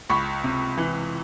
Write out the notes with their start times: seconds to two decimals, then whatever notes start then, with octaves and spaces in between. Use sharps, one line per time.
0.10 C#2 B5 C#6
0.44 C3
0.78 E3